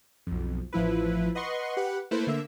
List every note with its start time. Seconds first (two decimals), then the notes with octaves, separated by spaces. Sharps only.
0.27 B1 F2
0.73 A1 F3 E4 B4
1.35 B4 D#5 F#5 C6 C#6
1.77 G4 B4 F#5
2.11 A3 A#3 E4 A4 B4 C5
2.27 D3 A#3 E5 E6